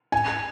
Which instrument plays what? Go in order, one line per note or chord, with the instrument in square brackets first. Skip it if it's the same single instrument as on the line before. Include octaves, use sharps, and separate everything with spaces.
[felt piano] G#5